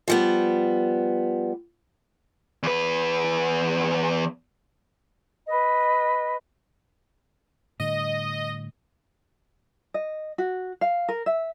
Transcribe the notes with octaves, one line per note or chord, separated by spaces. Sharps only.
F3 G3 B3
E2 B4
B4 D#5
A2 D3 G3 D#5
D#5
F#4
F5
A#4
E5